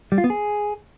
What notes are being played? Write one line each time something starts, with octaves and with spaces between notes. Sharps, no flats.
G3
F4
B3
G#4